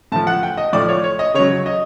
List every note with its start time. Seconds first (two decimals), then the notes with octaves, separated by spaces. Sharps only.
0.12 A2 A5
0.15 F3
0.27 F#5
0.43 G5
0.57 D#5
0.73 A2 F3 D5
0.89 C#5
1.04 C#5
1.19 D#5
1.34 C#3 F#3 C#5
1.66 D#5